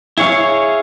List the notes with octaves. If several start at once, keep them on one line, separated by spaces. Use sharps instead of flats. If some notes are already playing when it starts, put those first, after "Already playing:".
E4 G#4 C#5 F5